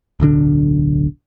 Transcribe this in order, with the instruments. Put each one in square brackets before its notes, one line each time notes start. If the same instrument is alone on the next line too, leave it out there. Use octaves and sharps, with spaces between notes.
[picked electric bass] D1 B1 D3 D4